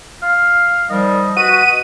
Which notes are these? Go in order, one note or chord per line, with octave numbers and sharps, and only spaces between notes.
F5
D#3 F3 G3 D#5
F#4 B4 D#7